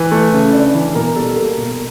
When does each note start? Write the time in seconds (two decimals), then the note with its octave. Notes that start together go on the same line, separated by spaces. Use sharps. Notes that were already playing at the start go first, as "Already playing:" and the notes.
Already playing: E3 B4
0.12 A3
0.33 C#3
0.53 D4
0.74 E3
0.95 B2 A#4
1.16 G3 A4
1.36 A#3 A4
1.57 B2